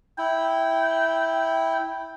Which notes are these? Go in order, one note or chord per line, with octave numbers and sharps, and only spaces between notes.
E4 G5